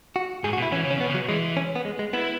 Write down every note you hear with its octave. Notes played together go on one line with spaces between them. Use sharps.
F#4
G#2 G#4
F#4
B2
E4
E3 C#4
C#3
C#4
B2 B3
C#3
F#3
E3 G#3
C#4
B3
G#3
G#3
B3 E4